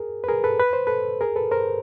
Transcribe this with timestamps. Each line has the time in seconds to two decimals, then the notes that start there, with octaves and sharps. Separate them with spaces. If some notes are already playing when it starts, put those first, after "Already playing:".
Already playing: G#4 A#4
0.24 B4
0.28 G#4 A#4
0.44 A4 B4
0.60 B4
0.73 C5
0.87 A4 B4
1.21 G#4 A#4
1.36 A4 B4
1.51 A#4 C5